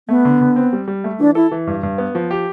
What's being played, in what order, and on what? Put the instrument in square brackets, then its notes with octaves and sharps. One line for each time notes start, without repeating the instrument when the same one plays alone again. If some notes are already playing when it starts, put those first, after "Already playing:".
[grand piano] A3 [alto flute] B3
[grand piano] D3
D3
C4
G3
G3
A3
[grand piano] E3 [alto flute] D4
[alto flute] E4 [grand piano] A4
[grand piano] E3
G2
G2
B3
F3
G4